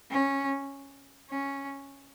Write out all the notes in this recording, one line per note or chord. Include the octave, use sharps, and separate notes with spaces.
C#4
C#4